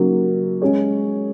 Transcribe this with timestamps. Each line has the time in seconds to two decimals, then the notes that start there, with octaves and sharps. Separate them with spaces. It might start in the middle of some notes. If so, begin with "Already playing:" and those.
Already playing: C#3 F#3 A#3 D#4
0.62 G#3 C#4 G#4 C#5